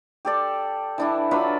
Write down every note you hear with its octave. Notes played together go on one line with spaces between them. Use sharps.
G4 A4 D5
E3 D4 E4
F#3 D4 F4 B4